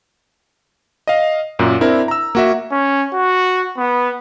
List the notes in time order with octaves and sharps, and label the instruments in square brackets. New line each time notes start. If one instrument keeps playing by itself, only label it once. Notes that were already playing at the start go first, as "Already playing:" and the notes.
[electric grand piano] D#5 F5
F#2 A#2
C4 D4 E4 A#4
A#5 E6
A#3 F#4 E5
[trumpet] C#4
F#4
B3